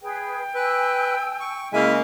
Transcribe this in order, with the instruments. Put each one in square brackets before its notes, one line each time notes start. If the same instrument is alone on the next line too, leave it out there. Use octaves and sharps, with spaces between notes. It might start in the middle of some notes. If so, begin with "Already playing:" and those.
[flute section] G#4 B4 [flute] G5
[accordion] B4 [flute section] G#5 E6
[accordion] C#6
[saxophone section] C#3 G#3 A#3 [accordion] E4 E5 G#5 [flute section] D#5 F6